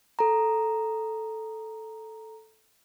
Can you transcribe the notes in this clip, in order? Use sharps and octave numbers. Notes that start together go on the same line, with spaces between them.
A4 A#5